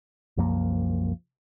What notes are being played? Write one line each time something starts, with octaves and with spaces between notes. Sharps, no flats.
C2 F#2 F3 A#3